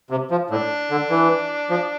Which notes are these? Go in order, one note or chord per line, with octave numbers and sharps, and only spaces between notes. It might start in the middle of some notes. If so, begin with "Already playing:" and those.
C3
F3
A2 D4
D3
E3
F3